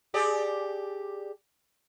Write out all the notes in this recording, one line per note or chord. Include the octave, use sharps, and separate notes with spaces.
G4 G#4 D5